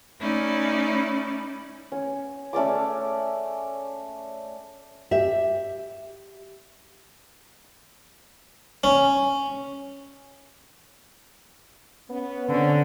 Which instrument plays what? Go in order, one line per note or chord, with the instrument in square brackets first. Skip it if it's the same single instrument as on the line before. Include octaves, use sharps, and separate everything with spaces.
[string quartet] A3 C#4 D#4 E4 D5
[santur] C#4
A3 C#4 D5 D6
[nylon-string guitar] G4 E5
[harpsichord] C#4
[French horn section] B3 C#4
[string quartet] D3 [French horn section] C4 C#4